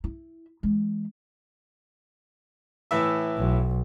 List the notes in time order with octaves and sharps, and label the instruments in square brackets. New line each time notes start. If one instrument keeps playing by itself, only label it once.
[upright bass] E4
E3 G#3
[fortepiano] A2 E3 E5
[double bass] B1